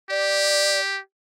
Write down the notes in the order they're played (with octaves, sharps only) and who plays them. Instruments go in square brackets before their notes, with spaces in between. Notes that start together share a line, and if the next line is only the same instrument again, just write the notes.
[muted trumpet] G4 [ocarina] D5